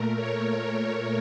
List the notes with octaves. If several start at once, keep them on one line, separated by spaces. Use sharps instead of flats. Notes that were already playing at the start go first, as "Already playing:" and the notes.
Already playing: A#2 A3 A#4
C#5
A#4
A#4